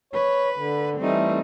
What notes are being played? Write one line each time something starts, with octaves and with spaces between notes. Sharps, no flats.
B4 C#5
D3
E3 G3 A3 C4 D#4